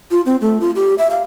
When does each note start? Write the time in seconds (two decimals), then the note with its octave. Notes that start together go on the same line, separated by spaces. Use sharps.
0.11 F4
0.26 C4
0.41 A3
0.61 F4
0.75 G4
0.98 E5
1.10 F5